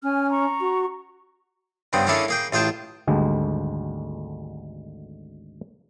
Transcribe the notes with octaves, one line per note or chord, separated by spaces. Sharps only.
C#4 G#5 F6
A#5 C#6
F#4
G2 C#3 B3 C4
A#3 C#4 D4 E4 G#4 A4
A#3 G#4 G5
A1 F4 G#4 G5 A5
G#1 D2 D3 G3 G#3